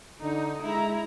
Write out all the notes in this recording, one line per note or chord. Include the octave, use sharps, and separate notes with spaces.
D3 D#4
G#3 E4 A#5